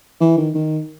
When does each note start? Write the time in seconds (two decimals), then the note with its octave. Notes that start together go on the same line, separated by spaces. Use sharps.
0.21 E3
0.37 D#3
0.55 D#3